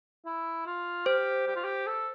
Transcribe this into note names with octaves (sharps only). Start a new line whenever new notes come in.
E4
F4
G4 C5
G4
F4
G4
A4